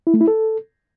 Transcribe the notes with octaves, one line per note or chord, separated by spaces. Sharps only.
E4
A3
E4
A4